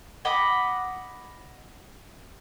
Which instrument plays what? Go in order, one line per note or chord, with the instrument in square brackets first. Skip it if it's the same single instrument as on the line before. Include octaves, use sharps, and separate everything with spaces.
[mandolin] D#5 F#5 B5 D6